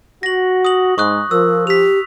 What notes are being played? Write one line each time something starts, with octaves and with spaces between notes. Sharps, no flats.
F#4 A#6 F#7
D#6 F#7
G#2 G#3 C#6 D#6 F#6
F3 A#4 E6
G4 B6 F7